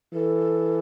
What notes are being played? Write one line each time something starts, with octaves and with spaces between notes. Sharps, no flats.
E3 A4